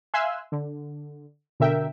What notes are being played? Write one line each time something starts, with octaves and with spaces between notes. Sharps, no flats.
E5 F5 G#5 C6 E6 F#6
D3
B2 D3 A#4 E5 G5